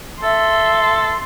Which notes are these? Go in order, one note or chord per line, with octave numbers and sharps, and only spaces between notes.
A4 E5 C6